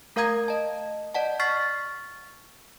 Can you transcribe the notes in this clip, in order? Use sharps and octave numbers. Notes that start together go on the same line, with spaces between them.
A3 A#4 F5 A#5 D#6 G#6
D#5 A5
D5 D#5 F#5 A5
C#6 F6 A6 B6 C7